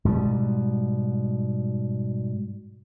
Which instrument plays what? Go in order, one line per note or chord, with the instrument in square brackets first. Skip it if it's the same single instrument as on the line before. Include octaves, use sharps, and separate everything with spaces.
[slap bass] G#2 B2 G3